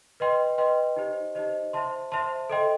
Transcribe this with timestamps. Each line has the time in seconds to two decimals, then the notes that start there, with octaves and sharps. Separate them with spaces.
0.20 B4 D#5 G5 C6
0.58 B4 D#5 G5 C6
0.96 D#4 G4 C5 D#5
1.35 D#4 G4 C5 D#5
1.73 C5 E5 A5 C6
2.12 C5 E5 A5 C6
2.50 A4 D#5 G5 C6